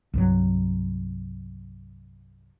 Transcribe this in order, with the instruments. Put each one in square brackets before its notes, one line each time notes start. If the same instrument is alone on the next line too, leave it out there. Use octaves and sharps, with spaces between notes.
[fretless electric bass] C2 G2 F#3